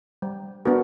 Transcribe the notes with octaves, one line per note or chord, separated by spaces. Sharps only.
G3
B3 D4 F#4 A#4